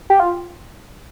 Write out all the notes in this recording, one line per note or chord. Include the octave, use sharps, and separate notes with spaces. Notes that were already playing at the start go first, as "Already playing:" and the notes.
G4
F4